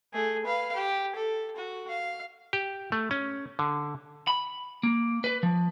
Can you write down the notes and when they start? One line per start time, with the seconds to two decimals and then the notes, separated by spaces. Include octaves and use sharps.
0.13 A3 G#4
0.45 B4 F5
0.75 G4
1.16 A4
1.56 F#4
1.89 F5
2.53 G4
2.92 A3
3.11 C#4
3.59 D3
4.27 B5
4.83 A#3
5.24 B4
5.43 F3